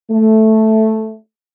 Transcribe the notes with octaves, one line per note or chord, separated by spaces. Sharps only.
A3